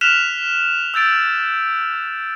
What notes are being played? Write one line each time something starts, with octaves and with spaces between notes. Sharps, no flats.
F6 F#6 B6 E7 F7
E6 G6 A6 D7